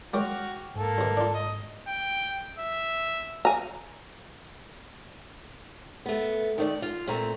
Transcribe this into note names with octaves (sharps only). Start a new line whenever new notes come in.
F#3 G#3 A#3 F#4 G5 D6 F6
G#2 A#3 A4
B1 B2
D4 F4
D#5
G5
E5
G#5 A#5
A3 B3
D#3 A3 D5
F4
A#2 A3 C4 A#5